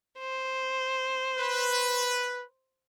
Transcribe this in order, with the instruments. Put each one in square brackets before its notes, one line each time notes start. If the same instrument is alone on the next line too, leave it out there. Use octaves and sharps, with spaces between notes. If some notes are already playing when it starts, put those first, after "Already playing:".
[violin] C5
[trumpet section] B4